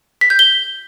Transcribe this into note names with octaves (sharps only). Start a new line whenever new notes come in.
B6
G6
G7